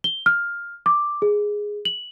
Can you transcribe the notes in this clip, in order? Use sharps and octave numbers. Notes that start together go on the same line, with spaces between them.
G7
F6
D6
G#4
F#7